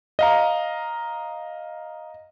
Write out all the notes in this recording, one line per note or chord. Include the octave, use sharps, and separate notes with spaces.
D#5 F5 A#5